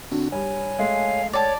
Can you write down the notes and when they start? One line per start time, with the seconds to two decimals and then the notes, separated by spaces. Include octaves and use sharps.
0.11 D3 C4 D4 F#4
0.32 G2 C#5 G#5
0.79 G#3 A3 F5
1.33 C#5 D5 A5